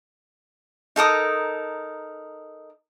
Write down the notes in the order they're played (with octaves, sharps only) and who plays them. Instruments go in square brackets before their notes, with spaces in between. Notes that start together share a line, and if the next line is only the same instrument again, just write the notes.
[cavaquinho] D#4 A4 A#4 D#6